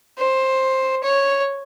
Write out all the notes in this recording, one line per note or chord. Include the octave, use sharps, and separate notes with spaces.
C5
C#5